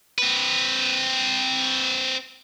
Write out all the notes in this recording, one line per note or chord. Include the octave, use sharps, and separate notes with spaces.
C4 B4